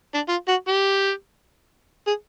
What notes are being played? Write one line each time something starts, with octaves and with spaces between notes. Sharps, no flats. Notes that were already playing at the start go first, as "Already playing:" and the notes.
D4
F4
F#4
G4
G#4